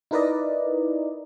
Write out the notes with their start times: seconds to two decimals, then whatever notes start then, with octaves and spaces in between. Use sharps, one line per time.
0.11 D#4 E4 A#4 B4 D5 D#5